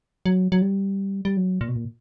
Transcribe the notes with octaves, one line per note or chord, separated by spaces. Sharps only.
F#3
F#3
G3
G3
F#3
A#2
B2
A#2